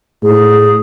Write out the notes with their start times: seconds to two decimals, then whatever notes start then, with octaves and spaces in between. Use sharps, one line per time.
0.23 A2 G#4